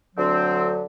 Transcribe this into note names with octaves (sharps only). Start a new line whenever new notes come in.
D2 D3 F#3 C4